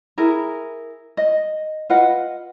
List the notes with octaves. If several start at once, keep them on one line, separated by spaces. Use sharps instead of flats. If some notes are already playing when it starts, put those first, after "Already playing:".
E4 G#4 A#4
D#5
F4 B4 D#5 F#5